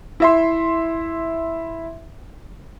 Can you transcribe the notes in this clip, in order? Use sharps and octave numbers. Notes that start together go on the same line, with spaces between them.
E4 E5 C6